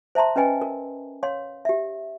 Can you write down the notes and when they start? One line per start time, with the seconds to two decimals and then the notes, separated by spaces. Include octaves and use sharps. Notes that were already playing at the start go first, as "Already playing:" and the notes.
0.15 C5 E5 A5 A#5 C6
0.36 C#4 B4 D#5 G5 G#5
0.61 A#4
1.23 C#5 F5 C6
1.65 G4 E5